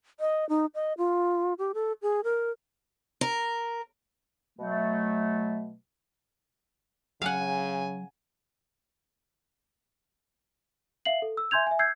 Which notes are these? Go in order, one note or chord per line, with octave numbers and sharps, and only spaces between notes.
D#5
D#4
D#5
F4
G4
A4
G#4
A#4
A#4
B2 F#3 A3
C#3 F#3 F5 F#5 G#5
E5 F5 C7 F#7
A4
E6
E5 G#5 C6 G6 G#6 F7
E5 G#5
E6 G6 G#6 C7